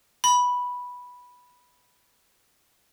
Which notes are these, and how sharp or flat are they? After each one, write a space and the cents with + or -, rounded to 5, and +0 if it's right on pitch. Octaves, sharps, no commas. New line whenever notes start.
B5 -5